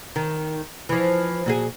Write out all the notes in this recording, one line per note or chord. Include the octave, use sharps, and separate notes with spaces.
D#3
E3 F3
A#2 F#4 G#4